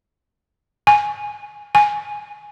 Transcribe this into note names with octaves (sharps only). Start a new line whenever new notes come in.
G#5
G#5